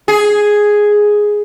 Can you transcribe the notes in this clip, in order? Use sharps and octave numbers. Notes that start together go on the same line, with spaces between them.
G#4